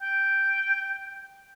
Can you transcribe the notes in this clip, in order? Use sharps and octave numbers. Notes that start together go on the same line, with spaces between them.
G5